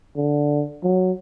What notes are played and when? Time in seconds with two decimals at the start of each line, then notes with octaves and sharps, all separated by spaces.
0.16 D3
0.83 F#3